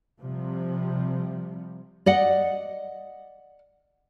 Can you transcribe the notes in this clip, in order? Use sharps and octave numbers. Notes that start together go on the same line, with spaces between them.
C3 F3 G3
D5 D#5 F#5